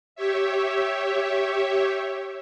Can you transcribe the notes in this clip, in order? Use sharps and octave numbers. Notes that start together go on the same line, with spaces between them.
G4 C#5 E5